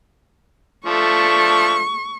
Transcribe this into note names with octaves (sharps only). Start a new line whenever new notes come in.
F3 A3 D4 C#6